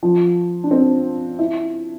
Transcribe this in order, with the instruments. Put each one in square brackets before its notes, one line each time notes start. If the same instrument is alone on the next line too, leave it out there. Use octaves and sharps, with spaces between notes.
[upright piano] F3
D4
C4
E4